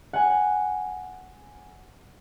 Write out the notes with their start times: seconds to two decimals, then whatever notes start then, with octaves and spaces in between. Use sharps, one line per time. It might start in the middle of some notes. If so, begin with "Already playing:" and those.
0.13 F#5 G#5